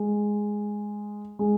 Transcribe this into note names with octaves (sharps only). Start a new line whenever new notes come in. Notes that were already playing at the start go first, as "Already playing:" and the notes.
Already playing: G#3
G#3